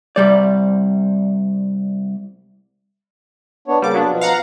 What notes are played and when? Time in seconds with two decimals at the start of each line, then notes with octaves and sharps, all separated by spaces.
0.16 C2 G3 D5
3.68 B3 D4 C#5
3.82 C#3 G3 A#3 D6
3.94 F#3 B3 D4
4.09 B2 F3
4.21 F5 F#5 A#5